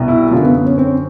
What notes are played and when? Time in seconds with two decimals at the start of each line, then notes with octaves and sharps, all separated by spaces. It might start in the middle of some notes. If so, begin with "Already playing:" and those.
Already playing: C2 B2
0.08 E4
0.31 F#2 D3 F4
0.43 B3
0.55 B3
0.66 C#4
0.78 C4